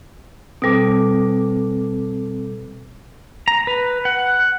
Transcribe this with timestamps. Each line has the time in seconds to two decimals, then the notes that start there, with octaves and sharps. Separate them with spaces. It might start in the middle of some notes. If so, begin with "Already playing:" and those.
0.62 B2 G3 C4 A4 D6
3.48 A#5
3.67 B4
4.05 F#5